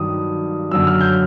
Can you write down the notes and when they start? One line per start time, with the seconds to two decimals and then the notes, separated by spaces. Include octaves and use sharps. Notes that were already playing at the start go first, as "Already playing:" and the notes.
Already playing: G2 D#3 F#3 D#6
0.71 F#2 D3 F#3 E6
0.87 F6
1.01 G6